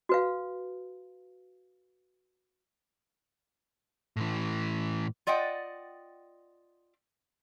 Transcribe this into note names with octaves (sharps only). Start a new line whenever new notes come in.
F#4 B4 F5
A2 E3
F4 D5 D#5 F#5 G5